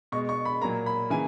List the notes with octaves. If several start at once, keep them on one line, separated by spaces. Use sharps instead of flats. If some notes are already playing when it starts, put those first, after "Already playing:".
B2 G#3 C#6
C#6
B5
A#2 F#3 A#3 A#5
B5
C#3 E3 A#3 G#5